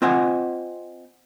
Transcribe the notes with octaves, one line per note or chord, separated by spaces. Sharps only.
C4 F4 C5 D#5 F#5 G#5